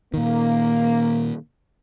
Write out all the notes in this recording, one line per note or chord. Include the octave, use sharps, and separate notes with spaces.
A#2 D#3 A#3